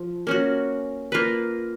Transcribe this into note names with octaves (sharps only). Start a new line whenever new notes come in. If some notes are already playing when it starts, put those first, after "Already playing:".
Already playing: F3
A#3 C#4 F#4
A#3 F4 B4